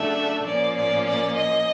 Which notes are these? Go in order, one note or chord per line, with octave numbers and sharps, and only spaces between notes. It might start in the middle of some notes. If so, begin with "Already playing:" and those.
Already playing: C#3 F#3 A3 D4 E5
A#2 F3 A#3 C#4 D5
D5
D5
D#5